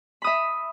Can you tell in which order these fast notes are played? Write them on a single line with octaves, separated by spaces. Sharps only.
B5 D#6 E5